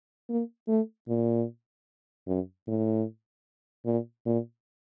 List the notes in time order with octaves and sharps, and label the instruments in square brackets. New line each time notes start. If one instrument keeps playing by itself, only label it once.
[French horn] A#3
A3
A#2
F#2
A2
A#2
A#2